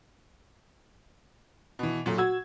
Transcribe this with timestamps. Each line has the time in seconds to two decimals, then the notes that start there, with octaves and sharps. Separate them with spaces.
1.79 B2 E3
2.06 A#2 F#3 A3
2.18 F#4 E6 G#6